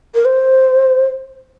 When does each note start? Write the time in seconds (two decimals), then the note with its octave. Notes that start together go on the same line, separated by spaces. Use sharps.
0.15 A#4
0.25 C5